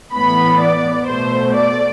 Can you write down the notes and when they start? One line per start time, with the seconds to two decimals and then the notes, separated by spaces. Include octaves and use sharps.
0.13 A2 E3 B3 B5
0.61 D5
1.07 B2 A3 C5
1.54 D5